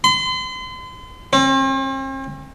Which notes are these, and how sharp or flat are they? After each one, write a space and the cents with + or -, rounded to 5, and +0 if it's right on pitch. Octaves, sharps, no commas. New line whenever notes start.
C6 -40
C4 +45